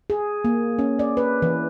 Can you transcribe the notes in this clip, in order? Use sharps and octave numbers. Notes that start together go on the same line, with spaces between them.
G#4
A#3
C#4
D5
B4
E3